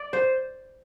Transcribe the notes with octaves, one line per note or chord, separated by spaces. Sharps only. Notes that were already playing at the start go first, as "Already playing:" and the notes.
Already playing: D5
C5